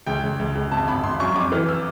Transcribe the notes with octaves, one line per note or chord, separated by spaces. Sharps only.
C#2 G5
C#2
C#2
C#2
G#1 A5
G#1 B5
G#1 C6
F#2 C#6
F2 D6
E3 F6
E6